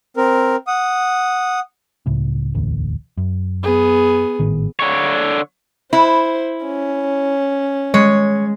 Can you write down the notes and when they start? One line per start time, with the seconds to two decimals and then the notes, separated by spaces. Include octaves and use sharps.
0.17 C4 A#4
0.67 F#5 D#6
2.06 C#2 A2 C#3
2.54 E1 A1 D2
3.17 F#2
3.63 B3 G#4
4.40 G#1 A2 D#3
4.80 D3 C#5
5.93 E4 C5
6.65 C#4
7.94 G#3 C#5